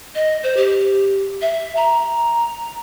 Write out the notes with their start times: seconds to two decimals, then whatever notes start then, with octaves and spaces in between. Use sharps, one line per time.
0.15 D#5
0.43 C5
0.57 G4
1.42 E5
1.77 A#5